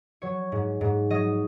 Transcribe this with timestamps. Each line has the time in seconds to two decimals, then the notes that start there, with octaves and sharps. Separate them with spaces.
0.22 F#3 C#5
0.52 G#2
0.81 G#2
1.10 F#3 D#5